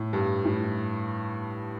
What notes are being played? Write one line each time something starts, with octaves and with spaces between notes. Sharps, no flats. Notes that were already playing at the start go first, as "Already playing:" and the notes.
Already playing: A2
G2
A2